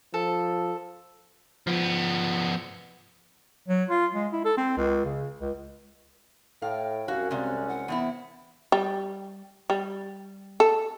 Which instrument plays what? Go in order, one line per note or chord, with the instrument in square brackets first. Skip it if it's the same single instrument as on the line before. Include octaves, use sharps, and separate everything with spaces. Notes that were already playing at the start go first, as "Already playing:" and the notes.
[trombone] F3 [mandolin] A4
[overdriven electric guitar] F3 B3
[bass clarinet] F#3
F4
G#3
E4
A4
C4
C#2
C#3
C#2
[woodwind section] A2 [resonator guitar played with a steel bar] F5 [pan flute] G5
[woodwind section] C2 F#2 C#4 [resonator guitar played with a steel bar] F#4 [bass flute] F5
[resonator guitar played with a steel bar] C3 G#3 [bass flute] C4 [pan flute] D5
[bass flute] E4 [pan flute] F#5
[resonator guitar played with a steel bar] E2 C4 E4 [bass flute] B3
[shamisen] G3
G3
A4